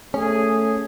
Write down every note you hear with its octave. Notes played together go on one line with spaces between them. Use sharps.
A3 C#4 G#4